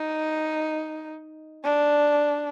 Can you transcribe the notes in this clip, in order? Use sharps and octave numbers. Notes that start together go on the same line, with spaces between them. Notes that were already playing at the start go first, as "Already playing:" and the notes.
Already playing: D#4
D4